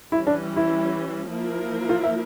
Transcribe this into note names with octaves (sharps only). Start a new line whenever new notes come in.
E3 G3 C#4 E4
D4
E4
F3 A#3 E4 A#4
F4
E5